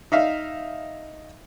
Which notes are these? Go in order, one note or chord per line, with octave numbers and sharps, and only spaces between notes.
D#4 E5 F5